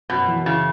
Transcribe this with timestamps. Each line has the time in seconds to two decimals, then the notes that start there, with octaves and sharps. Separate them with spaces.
0.10 F#2 B2
0.28 E3
0.46 C#3 E4